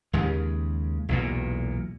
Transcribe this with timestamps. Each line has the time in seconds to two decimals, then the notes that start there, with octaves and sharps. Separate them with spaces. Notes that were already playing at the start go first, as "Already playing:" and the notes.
0.13 D#2 C#3 G#3
1.09 B1 E2 A#2